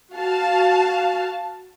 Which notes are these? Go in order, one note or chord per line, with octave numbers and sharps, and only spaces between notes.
F#4 F5 A5